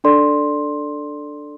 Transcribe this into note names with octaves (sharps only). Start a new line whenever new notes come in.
D4 A4 D5 C6